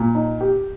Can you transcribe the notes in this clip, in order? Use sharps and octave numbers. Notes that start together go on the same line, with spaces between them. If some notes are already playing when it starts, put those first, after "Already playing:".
Already playing: A#2
D#4
G4